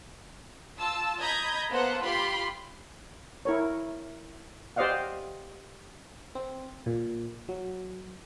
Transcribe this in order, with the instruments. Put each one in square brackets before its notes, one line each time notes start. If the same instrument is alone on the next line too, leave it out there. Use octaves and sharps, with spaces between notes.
[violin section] F4 A5 E6
D#5 A#5 B5 G6 G#6 A#6
A#3 B3 A4 C5 F#5
F4 G4 B5 C6
[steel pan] E4 A#4 C#5
G4 C5 D5 D#5 F5 F#5
[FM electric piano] C4
A#2
F#3